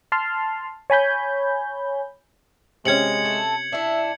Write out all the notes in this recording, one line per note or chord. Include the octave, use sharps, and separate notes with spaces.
A5 C6 F6
C#5 G#5 B5 G6
C3 G#3 C#4 G#6 C#7 F#7
A3 A4
D4 E4 E5